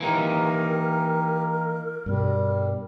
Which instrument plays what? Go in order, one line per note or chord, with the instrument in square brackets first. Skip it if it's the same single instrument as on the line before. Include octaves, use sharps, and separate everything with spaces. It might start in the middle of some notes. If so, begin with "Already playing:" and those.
[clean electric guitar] E3 A#3 D#4 [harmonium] G4 [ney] A#4
[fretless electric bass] G2 B2 [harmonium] G3